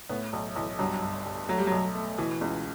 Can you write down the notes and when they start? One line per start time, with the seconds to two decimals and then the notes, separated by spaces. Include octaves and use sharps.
0.09 A2 B3
0.33 B1 F#3
0.56 B1 E3
0.79 G2 F#3
1.02 G1
1.26 G1
1.48 F#3 A3
1.58 G3
1.67 B1 F#3
1.95 A3
2.18 B2 E3
2.41 C#2